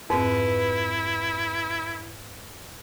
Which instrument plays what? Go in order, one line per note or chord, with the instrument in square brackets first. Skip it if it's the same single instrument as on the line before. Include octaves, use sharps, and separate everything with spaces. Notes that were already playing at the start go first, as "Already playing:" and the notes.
[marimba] F2 G#2 C4 [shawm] E4 [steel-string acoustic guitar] B4